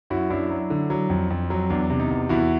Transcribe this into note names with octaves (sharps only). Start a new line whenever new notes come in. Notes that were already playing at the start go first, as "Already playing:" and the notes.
F#2 E4 F#4
F#2 D4 E4
F#3
D3
F#3
F2
F2
F#3
E2 D4
C3
D#4
E2
E2 E4 F#4